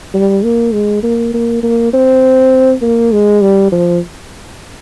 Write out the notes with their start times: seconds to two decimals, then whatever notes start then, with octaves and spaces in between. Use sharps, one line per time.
0.14 G3
0.44 A#3
0.73 G#3
1.03 A#3
1.34 A#3
1.63 A#3
1.93 C4
2.82 A#3
3.12 G#3
3.41 G3
3.72 F3